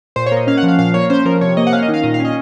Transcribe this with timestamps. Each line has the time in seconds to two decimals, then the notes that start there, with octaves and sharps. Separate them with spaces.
0.16 A#2 C5
0.26 C#5
0.32 A#3 D#5
0.47 C#4 F5
0.57 F#5
0.63 F3
0.68 F5
0.79 A#2 F5
0.94 A#3 C#5
1.10 C#4 C5
1.25 F3 A#4
1.41 C3 C#5
1.57 A#3 D#5
1.67 F#5
1.73 C#4 F5
1.83 D#5
1.88 D#3
1.94 F5
2.03 A#2 D#5
2.14 F5
2.20 C#4 D#5